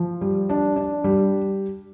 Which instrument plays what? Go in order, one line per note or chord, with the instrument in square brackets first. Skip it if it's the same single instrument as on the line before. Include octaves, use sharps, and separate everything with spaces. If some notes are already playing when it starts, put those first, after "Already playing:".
Already playing: [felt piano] F3
G3
D4
D4
G3